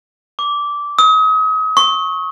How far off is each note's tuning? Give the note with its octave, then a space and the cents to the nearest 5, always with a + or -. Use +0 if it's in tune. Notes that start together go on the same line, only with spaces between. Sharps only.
D6 -15
D#6 +35
C#6 -15